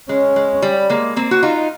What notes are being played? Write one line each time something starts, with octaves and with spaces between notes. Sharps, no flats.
G#3 C#4
G#3
G3
G#3 A#3
A#3 C4
F#4
D#4 F4